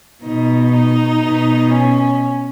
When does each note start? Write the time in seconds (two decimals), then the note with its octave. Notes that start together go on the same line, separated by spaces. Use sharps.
0.23 B2 D#4
0.73 D#4
1.24 B2
1.74 C#4